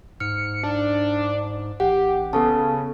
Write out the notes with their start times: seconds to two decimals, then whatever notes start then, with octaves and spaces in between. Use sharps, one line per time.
0.20 G#2 F6 C#7
0.64 D4
1.80 A1 G4 F#5
2.33 C#3 B3 A4 A5